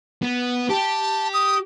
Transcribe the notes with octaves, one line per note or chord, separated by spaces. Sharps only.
B3
G4 A5
D#6